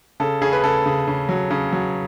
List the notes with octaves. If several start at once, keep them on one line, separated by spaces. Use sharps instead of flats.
C#3 A4
C#3 G#4
B4
C#3 A4
C#3
C#3
F#3
C#3
F#3